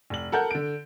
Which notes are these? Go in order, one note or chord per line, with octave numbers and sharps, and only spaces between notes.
F1 F#7
A4 A#4 F#5 G6
D3 D7